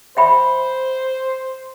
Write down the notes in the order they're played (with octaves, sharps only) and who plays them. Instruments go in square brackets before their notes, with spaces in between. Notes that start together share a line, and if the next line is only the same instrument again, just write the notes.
[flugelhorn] C5 [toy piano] E5 G5 B5